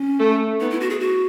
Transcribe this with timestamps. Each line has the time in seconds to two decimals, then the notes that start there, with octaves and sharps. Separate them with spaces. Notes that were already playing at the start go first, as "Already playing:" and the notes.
Already playing: C#4
0.20 A3
0.60 B3 D#4
0.70 E4
0.81 F#4
0.90 G#4
1.00 F#4